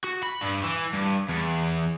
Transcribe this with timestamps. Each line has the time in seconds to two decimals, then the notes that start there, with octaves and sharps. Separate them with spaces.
0.04 F#4
0.23 B5
0.42 G2
0.64 E3
0.94 G2
1.29 E2